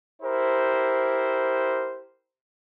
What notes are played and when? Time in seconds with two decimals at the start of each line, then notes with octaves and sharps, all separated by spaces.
0.22 E4 G4 A#4 C5